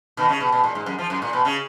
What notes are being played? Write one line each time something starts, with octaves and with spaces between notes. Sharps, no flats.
B2 D#3
C#3
B2
B2
A#2
G#2
F#2
F3
F#2
A#2
B2
C#3